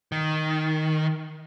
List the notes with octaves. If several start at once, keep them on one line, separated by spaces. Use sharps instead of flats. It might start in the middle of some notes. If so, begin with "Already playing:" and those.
D#3